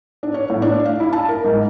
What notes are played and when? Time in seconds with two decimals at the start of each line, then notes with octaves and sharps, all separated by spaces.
0.23 D4
0.34 C#5
0.50 A2
0.62 D4
0.85 F5
1.00 E4
1.13 A5
1.29 A#4
1.44 G#2